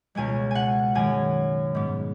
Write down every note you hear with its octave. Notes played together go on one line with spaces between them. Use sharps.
C#2 B2 G#3 B3 G#5
F#5 G#5
F#2 D#3 G#3 G#5
G#2 G#3 B3